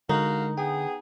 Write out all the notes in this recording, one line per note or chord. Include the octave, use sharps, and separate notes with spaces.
D3 G#3 D#4 F#4 A#4 F5
B3 G#4 G5